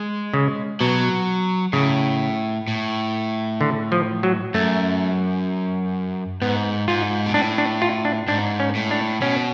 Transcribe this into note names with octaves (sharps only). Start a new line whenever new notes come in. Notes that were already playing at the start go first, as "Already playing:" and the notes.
Already playing: G#3
C#3
B2 F#3
A2 C#3
A2
D3
F3
F#3
F#2 A3
G#2 B3
G#2 F4
B2
A2 D4
D4
F4
D4
G#2 D4
C#4
A2
D4
B2 C#4